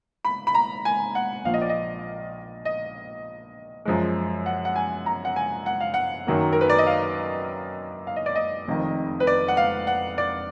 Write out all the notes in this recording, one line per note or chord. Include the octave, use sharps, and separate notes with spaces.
B5
B5
A#5
G#5
F#5
A#1 A#2 F3 F5
D#5
D5
D#5
D#5
F#2 F3 G#3
F#5
F#5
G#5
A#5
F#5
G#5
F#5
F5
F#5
F#2 D#3 F#3 A#3
A#4
B4
D5
D#5
F5
F5
D#5
D5
D#5
F1 F2 D#3
B4
D5
F#5
F5
F#5
D5